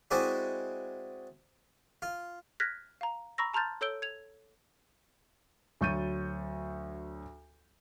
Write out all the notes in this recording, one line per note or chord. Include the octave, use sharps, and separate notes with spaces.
G#3 C4 E4 F#4 G#4 D5
F4
F6 F#6 G#6 A#6 B6
F5 A#5
A#5 B5 C#6 E6 A#6
A5 A#5 C6 F6 G6 A6
A4 C#5 E6 G6 D7 G7
G#6 F7
D2 F#3 C#6 G6 A6 D#7